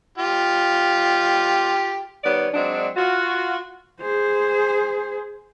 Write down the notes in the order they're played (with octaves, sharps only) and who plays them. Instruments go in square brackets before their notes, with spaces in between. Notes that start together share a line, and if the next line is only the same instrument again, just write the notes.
[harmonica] F4 G4
[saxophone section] D#3 G3 B3 C#5 D5
F#3 G#3 C4 D4
F4 F#4
[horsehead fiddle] G#4 C5